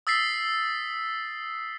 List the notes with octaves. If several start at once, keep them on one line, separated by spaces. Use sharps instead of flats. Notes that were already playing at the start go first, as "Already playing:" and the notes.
D#6 E6 A6 B6 C7